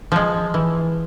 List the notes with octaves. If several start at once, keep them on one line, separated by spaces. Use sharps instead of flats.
F3 G#3
E3